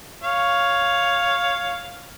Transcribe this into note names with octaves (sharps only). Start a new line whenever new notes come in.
C#5 F5